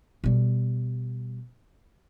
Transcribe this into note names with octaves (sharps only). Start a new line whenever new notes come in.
B2 G3